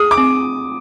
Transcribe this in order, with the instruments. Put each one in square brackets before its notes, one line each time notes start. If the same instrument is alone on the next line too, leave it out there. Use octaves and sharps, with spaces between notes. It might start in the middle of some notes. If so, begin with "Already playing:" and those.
Already playing: [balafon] G#4 [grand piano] D#6
[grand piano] D6
[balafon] C4